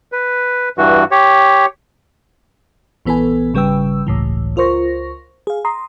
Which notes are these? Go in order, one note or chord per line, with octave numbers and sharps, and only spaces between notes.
B4
G2 E3 F#4
G4 C#5
A#1 E3 B3 A4 B4 G#5
G#1 C#3 G3 B4 G5 E6
G1 C#2 A2 E3
C#2 F4 A#4 C5 C#6 A#6
G#4 F5
A#5 C6 D#6